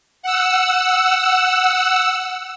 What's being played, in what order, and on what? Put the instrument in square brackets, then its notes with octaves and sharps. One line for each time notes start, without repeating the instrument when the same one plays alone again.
[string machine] F#5 E6